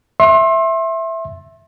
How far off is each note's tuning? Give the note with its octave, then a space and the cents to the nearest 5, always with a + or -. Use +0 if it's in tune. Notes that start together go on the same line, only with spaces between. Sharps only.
E5 +0 C6 +35